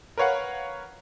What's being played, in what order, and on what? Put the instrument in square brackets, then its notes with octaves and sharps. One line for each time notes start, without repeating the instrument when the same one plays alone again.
[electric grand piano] A#4 B4 C#5 F5 F#5